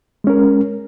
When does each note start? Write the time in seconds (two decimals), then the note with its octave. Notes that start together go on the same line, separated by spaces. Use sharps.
0.24 G#3
0.27 C#4
0.30 A#4